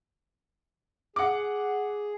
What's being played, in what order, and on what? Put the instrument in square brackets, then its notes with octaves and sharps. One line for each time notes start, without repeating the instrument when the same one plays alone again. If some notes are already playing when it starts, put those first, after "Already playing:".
[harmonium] G#4 [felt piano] F#5 D6